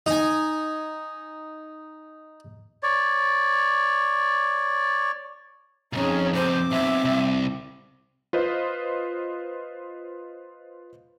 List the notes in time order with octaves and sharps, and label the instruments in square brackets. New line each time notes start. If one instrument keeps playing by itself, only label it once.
[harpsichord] D#4 G#5
[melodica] C#5 D5
[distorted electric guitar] C2 F2 [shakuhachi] C#4 [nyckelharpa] D#4 G#4
[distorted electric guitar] F2 B2 [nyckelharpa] C4 D6 [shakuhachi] C5
[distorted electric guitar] B1 [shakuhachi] E5
[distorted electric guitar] C2
[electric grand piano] F4 B4 C5 D#5